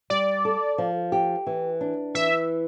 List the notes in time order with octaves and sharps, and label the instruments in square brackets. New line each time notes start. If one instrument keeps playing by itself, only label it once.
[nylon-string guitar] G3 [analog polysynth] D5
[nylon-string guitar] A4
F3
G4
E3
D4
[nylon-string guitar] E3 [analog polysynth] E5